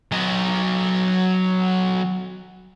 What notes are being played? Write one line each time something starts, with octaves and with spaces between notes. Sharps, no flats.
F#3 D#5